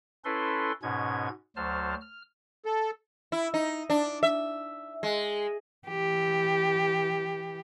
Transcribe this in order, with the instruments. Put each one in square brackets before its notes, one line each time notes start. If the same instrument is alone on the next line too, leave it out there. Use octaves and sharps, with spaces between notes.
[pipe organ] C#4 E4 A4 B4 C6
G#2 B2 C#4 G#6
D2 F#3 C5 A5 F6
F6
[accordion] A4
[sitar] E4
D#4
D4
E5
G#3
[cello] E3 G4